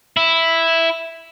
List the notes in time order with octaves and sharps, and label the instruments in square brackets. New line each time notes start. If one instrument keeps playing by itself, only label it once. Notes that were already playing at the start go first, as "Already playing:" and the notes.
[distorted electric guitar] E4